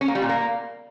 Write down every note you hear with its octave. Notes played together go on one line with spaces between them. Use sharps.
C#4
A#3
G3
A#2
A#3